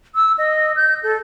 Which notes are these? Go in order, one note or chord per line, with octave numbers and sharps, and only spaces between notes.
E6
D#5
G6
A4